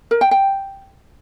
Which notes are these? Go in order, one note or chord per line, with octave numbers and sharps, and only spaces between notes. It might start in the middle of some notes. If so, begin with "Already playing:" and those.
A#4
G5
G5